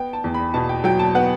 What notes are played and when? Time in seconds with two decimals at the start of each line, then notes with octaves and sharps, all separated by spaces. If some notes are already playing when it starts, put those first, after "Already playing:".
Already playing: B3 G5
0.13 A5
0.24 E2
0.34 B5
0.54 B2 A5
0.69 G5
0.84 F#3 G5
0.99 A5
1.15 B3 F#5